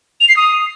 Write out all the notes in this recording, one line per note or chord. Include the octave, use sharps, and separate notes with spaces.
F7
C7
D#6